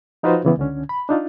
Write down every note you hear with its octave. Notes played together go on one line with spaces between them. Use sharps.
F3 D#4 F4 F#4 B4 C5
C#3 E3 B3
C#2 D3 C#4
B5
D4 D#4 F4